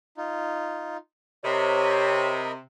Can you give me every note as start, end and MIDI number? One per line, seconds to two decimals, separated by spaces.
0.17 0.97 63
0.17 0.97 65
1.44 2.59 48
1.44 2.52 70
1.44 2.37 73
1.44 2.52 75
1.44 2.52 83